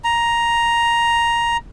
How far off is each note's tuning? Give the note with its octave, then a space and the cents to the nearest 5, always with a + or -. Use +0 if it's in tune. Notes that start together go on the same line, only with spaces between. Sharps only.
A#5 +5